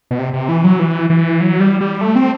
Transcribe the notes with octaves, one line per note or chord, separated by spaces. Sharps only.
B2
C3
C3
E3
F#3
E3
E3
F#3
G3
G3
A3
C4